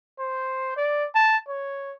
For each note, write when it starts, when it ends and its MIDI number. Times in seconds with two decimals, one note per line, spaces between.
0.19 0.76 72
0.77 1.05 74
1.15 1.37 81
1.49 1.93 73